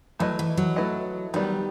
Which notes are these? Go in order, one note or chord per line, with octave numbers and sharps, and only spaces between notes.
F#3 A3 E4 B4 D#5
E3
F#3
A3 E4 B4 D#5
D#3 F#3 G3 B3